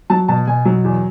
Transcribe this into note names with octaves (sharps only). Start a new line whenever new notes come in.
F#3 A5
B2 A5
B2 G#5
F#3
E2